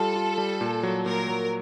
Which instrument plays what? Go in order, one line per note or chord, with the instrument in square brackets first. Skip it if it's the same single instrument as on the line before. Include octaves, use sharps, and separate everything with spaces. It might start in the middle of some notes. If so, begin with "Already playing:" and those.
Already playing: [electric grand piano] G3 F4 [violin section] A4
[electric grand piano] F4
G3
A#2
F#3
[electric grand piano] A#2 [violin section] A#4
[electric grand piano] F#3